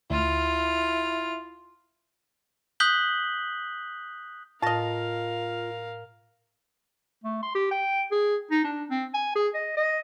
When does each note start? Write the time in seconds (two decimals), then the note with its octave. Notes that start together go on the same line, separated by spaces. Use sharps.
0.10 D2 E4 F4 F6
2.80 D#6 F#6 G6 B6 F#7 G7
4.62 A2 F4 A#4 D#5 F5 A5 A#6
7.24 A3
7.42 C6
7.55 G4
7.71 G5
8.11 G#4
8.51 D#4
8.64 D4
8.90 C4
9.14 G#5
9.35 G#4
9.54 D#5
9.77 D#5